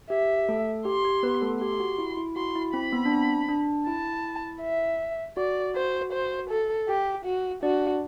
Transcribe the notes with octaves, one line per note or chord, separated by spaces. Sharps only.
G4 E5
A3 A4
G4 C6
G4
B3 B4
A3 A4
G4 C6
F#4
E4
E4
F#4 C6
E4
C4 B5
B3
D4
C4
D4
E4 A5
E5
F#4 D5
F#4 C5
C5
A4
G4
F#4
D4 F#4 D5